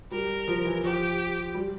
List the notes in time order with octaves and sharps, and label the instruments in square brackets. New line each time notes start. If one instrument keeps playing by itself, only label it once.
[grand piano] G3 [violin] A#4
[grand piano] F3
E3
[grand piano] F3 [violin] G4
[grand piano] G3